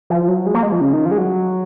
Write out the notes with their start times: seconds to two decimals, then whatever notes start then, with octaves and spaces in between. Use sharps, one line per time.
0.10 F3
0.28 F#3
0.46 G#3
0.54 A#3
0.63 G#3
0.72 F3
0.81 C#3
0.93 D#3
1.06 F3
1.11 G#3
1.18 F#3